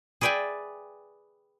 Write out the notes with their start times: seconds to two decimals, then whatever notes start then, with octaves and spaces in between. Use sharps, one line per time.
0.21 G#4 B4 D5 E5 G5 G#5